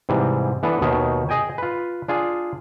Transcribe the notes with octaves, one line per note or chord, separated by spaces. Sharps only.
G#2 C3 E3 G3
E3 B3 D4 A4 B4
D#2 B2 D#3 D#4 C#5 E5
G#4 D#5 G5 G#5
F4 B4
D4 F4 G#4